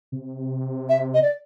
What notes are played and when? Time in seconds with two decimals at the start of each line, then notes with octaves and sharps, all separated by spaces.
0.12 C3
0.89 E5
1.14 D#5
1.23 D5